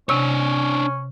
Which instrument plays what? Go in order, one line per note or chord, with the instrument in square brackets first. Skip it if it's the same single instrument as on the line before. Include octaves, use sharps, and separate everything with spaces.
[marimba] C3 C#6 [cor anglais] C#4 [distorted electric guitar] D4 C#5